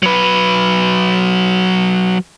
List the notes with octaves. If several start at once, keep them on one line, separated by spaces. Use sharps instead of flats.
F#3 B4